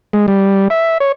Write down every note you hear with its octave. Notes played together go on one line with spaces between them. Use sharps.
G#3
G3
E5
C#5